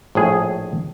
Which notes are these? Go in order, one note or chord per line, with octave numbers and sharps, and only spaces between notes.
A#1 A2 G#4